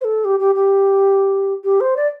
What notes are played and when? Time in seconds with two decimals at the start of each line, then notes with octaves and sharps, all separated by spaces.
0.01 C5
0.04 A4
0.25 G4
0.40 G4
0.55 G4
1.64 G4
1.80 C5
1.97 D5